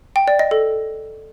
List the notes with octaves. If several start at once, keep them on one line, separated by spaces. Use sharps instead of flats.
G5
D5
D#5
A4